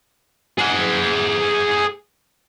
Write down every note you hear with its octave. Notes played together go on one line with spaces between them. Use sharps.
G#4 F#5